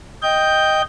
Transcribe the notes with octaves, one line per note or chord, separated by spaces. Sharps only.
D#5 G5 G6